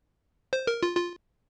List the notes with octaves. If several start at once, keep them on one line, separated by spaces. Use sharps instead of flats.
C5
A#4
F4
F4